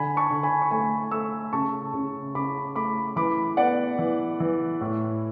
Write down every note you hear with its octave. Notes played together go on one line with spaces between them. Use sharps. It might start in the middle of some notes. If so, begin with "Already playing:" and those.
Already playing: D3 G#5 B5
A5 C#6
D3
G#5 B5
C#6
A3 G#5 B5
A3 C#6 E6
C#3 A5 C#6
C#3
C#3 B5 D6
A3 B5 D6
E3 B5 D6
B3 D5 F#5
E3
E3
A2